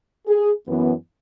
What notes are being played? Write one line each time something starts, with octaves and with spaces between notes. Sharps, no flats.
G#4
F#2 E3 B3